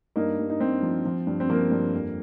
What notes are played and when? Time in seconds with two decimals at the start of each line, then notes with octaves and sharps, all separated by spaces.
0.16 G2 A#3 D#4
0.39 G2
0.50 D#4
0.60 G2 C4
0.83 F3
1.05 F3
1.27 G2
1.40 C4
1.50 F3 A#3
1.71 G2
1.94 F2